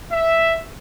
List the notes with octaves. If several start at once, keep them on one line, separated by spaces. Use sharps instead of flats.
E5